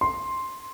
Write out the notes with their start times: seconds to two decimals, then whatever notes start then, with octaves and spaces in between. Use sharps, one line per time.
0.01 C6